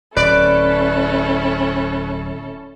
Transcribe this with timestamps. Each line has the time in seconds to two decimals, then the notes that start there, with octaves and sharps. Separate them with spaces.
0.17 D1 C#4 E4 A4 B4 D5